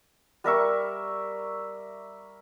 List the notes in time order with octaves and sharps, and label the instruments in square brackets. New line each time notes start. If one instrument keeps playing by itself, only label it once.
[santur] G3 A#4 E5 C#6